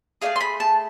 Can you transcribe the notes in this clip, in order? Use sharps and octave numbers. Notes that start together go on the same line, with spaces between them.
A3 D4 G#4 F5
C6
B5
A5